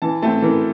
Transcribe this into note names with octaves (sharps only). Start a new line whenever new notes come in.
E3 A5
A3 C4 A5
E3 A#4